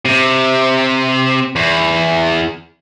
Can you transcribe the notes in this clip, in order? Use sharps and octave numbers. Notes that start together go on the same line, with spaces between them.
C3
E2